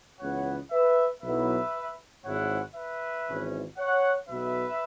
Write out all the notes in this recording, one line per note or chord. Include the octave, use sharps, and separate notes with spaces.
C#2 C#3 E3 B3 C#5 F#5
B4 E5
B1 B2 F#3 B3 E4 B4 E5
G#1 G#2 G#3 E4 C#5 F#5
B4 E5
G#1 G#2 E3 C#4
C#5 F#5
B1 B2 B3 B4 E5